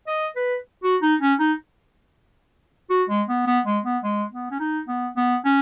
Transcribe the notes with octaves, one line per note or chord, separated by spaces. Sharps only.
D#5
B4
F#4
D#4
C#4
D#4
F#4
G#3
B3
B3
G#3
B3
G#3
B3
C#4
D#4
B3
B3
C#4